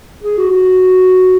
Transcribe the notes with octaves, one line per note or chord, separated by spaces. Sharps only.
G#4
F#4
F#4